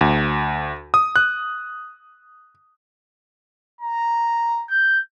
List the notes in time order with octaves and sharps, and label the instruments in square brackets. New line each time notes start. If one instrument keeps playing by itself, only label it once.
[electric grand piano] D2
D#6
F#6
[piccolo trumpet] A#5
G6